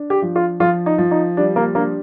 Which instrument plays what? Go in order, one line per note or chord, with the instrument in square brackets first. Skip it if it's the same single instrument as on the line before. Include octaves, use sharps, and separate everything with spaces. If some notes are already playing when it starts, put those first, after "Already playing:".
Already playing: [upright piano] D4
[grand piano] G4
[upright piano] F3
[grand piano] F4
[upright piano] F3 [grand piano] F4
[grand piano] D#4
[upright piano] F3
[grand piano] D#4
[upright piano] G3 [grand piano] D4
[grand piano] A#3
[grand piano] A#3 [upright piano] D4